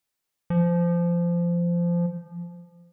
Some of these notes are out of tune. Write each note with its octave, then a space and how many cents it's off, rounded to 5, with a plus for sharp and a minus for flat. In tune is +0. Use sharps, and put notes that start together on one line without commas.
F3 -20